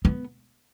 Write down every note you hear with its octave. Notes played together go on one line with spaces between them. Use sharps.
B3